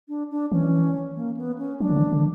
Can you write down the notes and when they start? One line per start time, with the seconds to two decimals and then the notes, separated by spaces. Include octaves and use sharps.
0.08 D4
0.31 D4
0.52 E3 C#4
1.16 A#3
1.37 B3
1.58 C#4
1.80 F#3 D4
1.90 D3
1.96 E3
2.12 D3